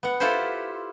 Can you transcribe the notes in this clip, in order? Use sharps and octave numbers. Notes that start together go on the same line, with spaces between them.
B3 F#5
E4 F4 G4 A4 B4 C5